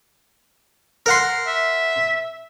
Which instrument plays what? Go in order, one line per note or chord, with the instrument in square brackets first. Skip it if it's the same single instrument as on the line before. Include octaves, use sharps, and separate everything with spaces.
[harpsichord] A#4 F#5 C6
[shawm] E5